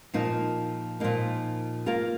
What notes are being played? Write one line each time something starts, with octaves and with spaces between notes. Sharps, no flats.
A#2 F3 A#3 D#4
A#2 F3 A#3 D#4
A#3 F4 A#4